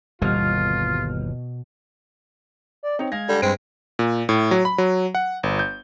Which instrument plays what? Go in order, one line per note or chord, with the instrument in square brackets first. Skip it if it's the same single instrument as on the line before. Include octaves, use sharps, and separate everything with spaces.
[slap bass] G1 D#2 E3 [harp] B2 [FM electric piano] G3 F6 [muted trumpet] F4
[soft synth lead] D5
[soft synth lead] C4 [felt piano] D#4 C#5
[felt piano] G#3 F5 A#6 [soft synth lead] G#6
[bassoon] D3 [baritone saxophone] G3
[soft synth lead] G2 [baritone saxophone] G#3 [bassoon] C4 [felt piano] B4 D7
[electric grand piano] A#2
A2
F#3
B5
F#3
F#5
G1
G6